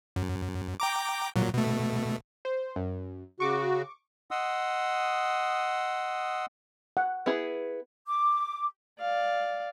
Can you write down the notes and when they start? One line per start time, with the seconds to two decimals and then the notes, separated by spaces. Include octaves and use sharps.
0.16 F#2
0.80 G5 A#5 D6
1.36 A#2 F#3
1.54 B2 A3
2.45 C5
2.76 F#2
3.40 C#3 F#4 C#6 D6
4.31 D#5 F#5 C6 D#6 E6
6.97 F#5
7.26 B3 E4 G#4
8.07 D6
9.01 D5 F5